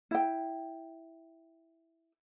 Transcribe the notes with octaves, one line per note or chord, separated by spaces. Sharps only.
E4 G5